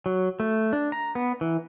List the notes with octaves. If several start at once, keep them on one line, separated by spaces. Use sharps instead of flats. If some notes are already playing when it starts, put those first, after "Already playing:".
F#3
A3
D4
A#5
B3
E3